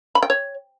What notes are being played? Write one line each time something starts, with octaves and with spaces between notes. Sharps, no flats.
B5
G5
C#5